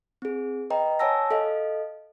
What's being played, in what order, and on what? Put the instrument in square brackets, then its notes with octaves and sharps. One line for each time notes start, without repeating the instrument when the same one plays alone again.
[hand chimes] C4 G#4
B4 D#5 G5 A#5
C#5 F#5 G#5 A5 E6 A#6
A4 D#5 F5